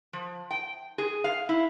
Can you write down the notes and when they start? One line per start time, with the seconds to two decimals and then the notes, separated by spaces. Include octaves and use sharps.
0.13 F3
0.51 G5
0.98 G#4
1.24 F5
1.49 E4